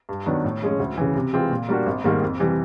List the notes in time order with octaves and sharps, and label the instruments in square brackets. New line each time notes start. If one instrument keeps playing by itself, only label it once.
[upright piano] G2
D#3 F#3 B3 D4
A2
F3 G#3 C#4
D2
C#3 E3
C3
E3 G#3 C4 F4
A#2
G3 A#3 D4 F#4
G#1
G#2 D#3 G3 A#3
F2
C3 E3 G3